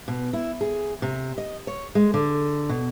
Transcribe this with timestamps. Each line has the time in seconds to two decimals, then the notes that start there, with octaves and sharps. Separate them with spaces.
0.08 B2
0.33 E4
0.61 G#4
1.02 C3
1.38 D#5
1.67 C#5
1.95 G#3
2.14 D3
2.69 B2